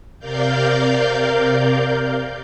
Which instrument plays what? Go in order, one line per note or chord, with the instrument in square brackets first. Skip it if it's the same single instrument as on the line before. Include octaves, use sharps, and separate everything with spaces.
[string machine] C3 A#4 D5 F5 G6